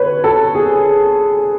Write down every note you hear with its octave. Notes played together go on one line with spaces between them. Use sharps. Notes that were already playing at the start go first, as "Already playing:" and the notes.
Already playing: B4 C#5
A4
G#4